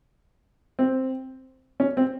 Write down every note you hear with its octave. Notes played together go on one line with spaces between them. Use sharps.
C4
C#4
C4